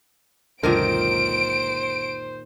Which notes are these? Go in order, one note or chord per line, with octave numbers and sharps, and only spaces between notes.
C#2 F#2 A#2 D3 D#3 A#4 C5 D7